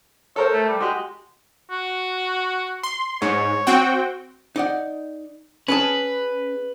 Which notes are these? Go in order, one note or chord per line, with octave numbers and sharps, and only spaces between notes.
A4 A#4 C5 C#5
A3
G3
G#3 F#4 G4
F#4
C6
G#2 C#5
C4 F#4 G5
D#4 D5 F#5
C#4 G#4 B4 A5